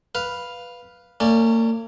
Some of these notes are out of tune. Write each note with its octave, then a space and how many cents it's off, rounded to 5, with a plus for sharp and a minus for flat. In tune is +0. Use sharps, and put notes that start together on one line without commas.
B4 +0 F5 +0
A#3 -40 C#4 +0 D5 +0